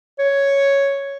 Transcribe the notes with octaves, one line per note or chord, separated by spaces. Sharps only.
C#5